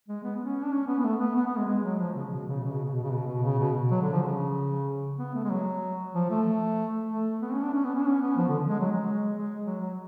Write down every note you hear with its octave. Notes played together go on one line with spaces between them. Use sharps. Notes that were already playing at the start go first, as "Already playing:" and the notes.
G#3
B3
C#4
D4
C#4
B3
B3
A3
B3
B3
B3
G#3
G#3
F#3
F3
C#3
B2
C#3
C#3
B2
C#3
B2
C#3
B2
B2
C#3
B2
F#3
D3
F3
C#3
B3
A3
G#3
F#3
F3
A3
A3
B3
C#4
D4
C#4
B3
C#4
D4
C#4
B3
F3
D3
G#3
F#3
G#3
G#3
F#3
F#3